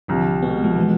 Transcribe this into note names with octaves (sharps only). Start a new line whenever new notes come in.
C2 D3 F3
B2 B3
A3
G#3
F3 A3
B2 E3 G#3